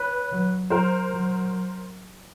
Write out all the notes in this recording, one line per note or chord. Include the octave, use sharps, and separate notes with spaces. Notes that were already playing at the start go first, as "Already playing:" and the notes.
Already playing: B4 C#5
F#3
F#3 A#4 C5
F#3